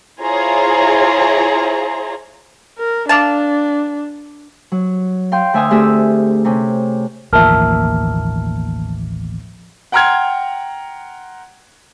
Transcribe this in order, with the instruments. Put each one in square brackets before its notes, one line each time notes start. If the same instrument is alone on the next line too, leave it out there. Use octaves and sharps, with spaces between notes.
[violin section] E4 F4 G#4 C5 C#5 A#5
[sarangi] A#4
[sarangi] D4 [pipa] D5 F5 A5
[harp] F#3
F5 G5 C6
D2 E5 G#5 C6 D#6 F6
A3 C4 D4 G4 G#4 E5
C3 C#4
[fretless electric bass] A1 D#2 B2 [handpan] F3 E5 [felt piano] A#3 [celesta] A5 F6
[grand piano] F#5 G5 A#5 C6 F6 G#6